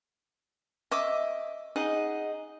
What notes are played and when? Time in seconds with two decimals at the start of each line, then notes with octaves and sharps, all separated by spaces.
0.91 D#5 E5 D6
1.76 D#4 G#4 D#5 F#5